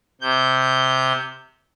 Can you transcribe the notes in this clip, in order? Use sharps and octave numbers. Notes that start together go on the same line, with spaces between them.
C3 G6